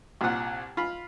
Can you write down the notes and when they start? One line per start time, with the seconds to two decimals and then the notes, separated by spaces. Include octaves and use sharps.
0.21 C2 A#2 F#5
0.77 F4 B5